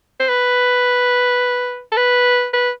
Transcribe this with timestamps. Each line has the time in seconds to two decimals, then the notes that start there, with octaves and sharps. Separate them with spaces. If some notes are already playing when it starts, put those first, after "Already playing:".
0.20 C5
0.29 B4
1.92 A4
1.97 B4
2.54 B4